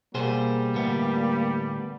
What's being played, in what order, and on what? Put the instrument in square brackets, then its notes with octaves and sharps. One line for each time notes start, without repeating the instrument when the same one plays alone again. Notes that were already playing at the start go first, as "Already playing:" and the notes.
[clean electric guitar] B2 G#4 C5 [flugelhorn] G3 [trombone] A#3
[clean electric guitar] D2 A2 B3